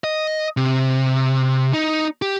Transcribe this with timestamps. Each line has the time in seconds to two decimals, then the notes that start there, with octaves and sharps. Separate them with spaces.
0.04 D#5
0.57 C3
1.74 D#4
2.22 G4